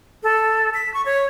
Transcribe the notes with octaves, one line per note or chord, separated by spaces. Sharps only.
A4
B6
C#6
C#5